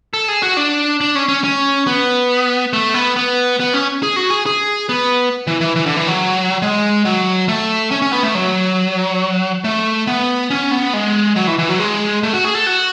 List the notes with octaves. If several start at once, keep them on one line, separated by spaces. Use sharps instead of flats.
A4
G#4
F#4
D4
D4
C#4
C#4
C#4
B3
A3
B3
B3
B3
C#4
G#4
F#4
G#4
G#4
B3
E3
E3
E3
D3
E3
F#3
G#3
F#3
A3
C#4
C#4
B3
A3
F#3
A3
B3
C#4
B3
G#3
F#3
E3
E3
F#3
G#3
A3
F#4
G#4
A4
F#4